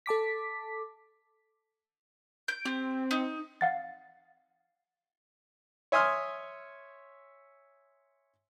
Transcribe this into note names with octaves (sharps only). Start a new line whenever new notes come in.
A4 A5 D6 B6
G6 D7
C4 G4
D#4
F5 F#5 A6
C#5 E5 G#5 C6 D#6 F6